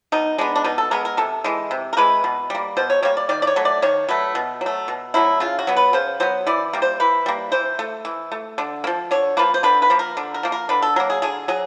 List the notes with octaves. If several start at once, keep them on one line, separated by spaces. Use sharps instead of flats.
B2 D#4
G#3 B3 D4
D4
B2 D#4
A4
G#3 B3 A#4
A#4
C3 A4
E3 G#3
C3
A#4
E3 G#3 B4
B2
G3 A#3
B2 C5
C#5
G3 A#3 C#5
D5
D#3 D5
D5
C#5
F#3 A3
D5
D#3 C#5
F#3 A3 B4
B2
F#3
A3
B2
F#3 A3 E4
C#3 F4
F#4
F#3 B3
B4
C#3 C5
F#3 B3 C5
E3 D5
G3 A#3
C5
E3 B4
G3 A#3
E3 C5
A3
E3
A3
D3
A#3
F3
D3 C#5
F3 A#3 B4
C5
D3 B4
B4
F3 A#3
A#4
D3
A#4
F3 A#3
A#4
D3 B4
A4
F#3 A#3 A#4
G#4
D3 G#4
F#3 G#4